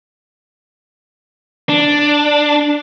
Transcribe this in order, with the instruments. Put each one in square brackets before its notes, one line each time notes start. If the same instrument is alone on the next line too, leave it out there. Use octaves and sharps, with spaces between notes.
[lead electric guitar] D4